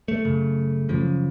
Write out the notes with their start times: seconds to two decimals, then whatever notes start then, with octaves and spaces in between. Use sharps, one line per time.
0.08 A3
0.25 F#2 C#3
0.89 F#2 C#3 F3